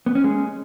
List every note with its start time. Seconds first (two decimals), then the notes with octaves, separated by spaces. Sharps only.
0.06 B3
0.15 C#4
0.24 G#3